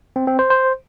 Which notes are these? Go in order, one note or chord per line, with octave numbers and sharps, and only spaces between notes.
C4
C4
C5
C5